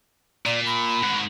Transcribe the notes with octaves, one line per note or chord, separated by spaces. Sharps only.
A#2 D5
B5
G#2 F#4